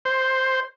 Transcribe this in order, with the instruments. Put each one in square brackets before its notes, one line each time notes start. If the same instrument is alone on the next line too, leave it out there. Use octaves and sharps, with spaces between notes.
[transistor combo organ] C5